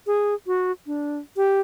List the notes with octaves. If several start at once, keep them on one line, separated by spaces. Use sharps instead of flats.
G#4
F#4
D4
G4